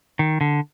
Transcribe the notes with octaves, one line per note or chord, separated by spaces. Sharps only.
D#3
D3